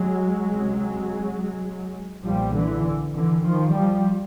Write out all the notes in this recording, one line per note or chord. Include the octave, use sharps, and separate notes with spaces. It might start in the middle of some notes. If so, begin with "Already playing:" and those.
Already playing: F#3 G#3
C#2 C3
B1 A#2 F3 G3
D3 E3
D3 E3
D#3 F3
F3 G3